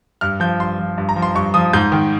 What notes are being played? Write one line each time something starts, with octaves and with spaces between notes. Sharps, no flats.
G2 F6
F3 G6
G2 C6
F3
G2
A#5
F3
C6
G2 C#6
F3 D#6
G#2 G6
D#3